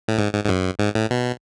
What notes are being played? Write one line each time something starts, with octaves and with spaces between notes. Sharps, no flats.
A2
G#2
G#2
G#2
F#2
G#2
A2
B2